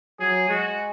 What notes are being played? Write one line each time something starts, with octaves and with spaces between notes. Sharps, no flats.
F#3 G#4
G#3 F#4